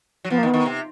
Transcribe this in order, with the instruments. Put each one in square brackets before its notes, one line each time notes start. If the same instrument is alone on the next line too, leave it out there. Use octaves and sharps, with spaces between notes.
[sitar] F#3
[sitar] F3 [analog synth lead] B3
[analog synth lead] A#3
[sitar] D#3
[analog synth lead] B3
[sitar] D#3
C3